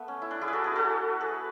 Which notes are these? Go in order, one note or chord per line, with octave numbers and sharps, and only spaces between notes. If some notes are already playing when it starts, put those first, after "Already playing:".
Already playing: A3 B3
C#4
E4
D4
E4 G#4
B4
F#4 A4
G#4 B4
F#4 A4
G#4 B4